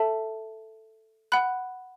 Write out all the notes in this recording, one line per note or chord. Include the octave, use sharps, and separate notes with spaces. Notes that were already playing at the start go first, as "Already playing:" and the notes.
Already playing: A4 E5 A5
F#5 B5 F#6